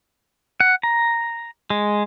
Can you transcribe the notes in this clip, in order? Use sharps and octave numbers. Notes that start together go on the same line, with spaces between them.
F#5
A#5
G#3